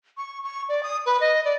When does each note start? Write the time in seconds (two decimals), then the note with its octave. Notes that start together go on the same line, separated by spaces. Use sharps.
0.17 C#6
0.44 C#6
0.69 D5
0.83 D#6
1.06 B4
1.21 D#5
1.45 D5